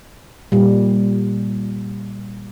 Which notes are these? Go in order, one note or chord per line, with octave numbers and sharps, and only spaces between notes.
A#2 G3